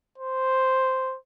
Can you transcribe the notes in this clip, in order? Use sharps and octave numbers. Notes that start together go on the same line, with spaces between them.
C5